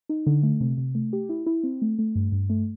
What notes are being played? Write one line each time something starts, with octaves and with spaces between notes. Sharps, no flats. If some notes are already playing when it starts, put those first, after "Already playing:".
D#4
D3
A3
C3
C3
A3
G4
E4
E4
C4
A3
A3
G2
G2
A3